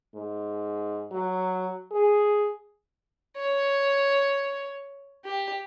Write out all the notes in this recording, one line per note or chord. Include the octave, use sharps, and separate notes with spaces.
G#2
F#3
G#4
C#5
G4